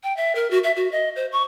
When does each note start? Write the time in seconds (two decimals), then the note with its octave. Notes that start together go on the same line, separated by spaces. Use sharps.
0.04 G5
0.17 E5
0.35 A#4
0.51 F#4
0.64 E5
0.77 F#4
0.92 D#5
1.16 C5
1.32 C#6